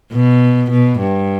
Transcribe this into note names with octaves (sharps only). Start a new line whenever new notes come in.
B2
B2
G2